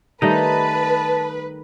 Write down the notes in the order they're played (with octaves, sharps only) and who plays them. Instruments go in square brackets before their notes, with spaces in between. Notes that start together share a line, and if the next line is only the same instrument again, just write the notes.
[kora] D#3 G3 A3 [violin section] B4 [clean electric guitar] D#5 A#5 [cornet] A5